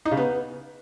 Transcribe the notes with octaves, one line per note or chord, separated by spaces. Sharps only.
D#4
C#3
B3